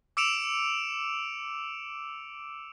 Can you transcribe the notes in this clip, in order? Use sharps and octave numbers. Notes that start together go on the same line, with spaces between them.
D6 E6 C#7 D7 E7 F7